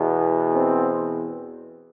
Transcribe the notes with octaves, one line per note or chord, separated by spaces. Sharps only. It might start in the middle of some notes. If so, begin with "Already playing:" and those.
Already playing: E2 B2
C4